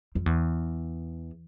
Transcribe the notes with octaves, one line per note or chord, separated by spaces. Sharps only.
F2
E2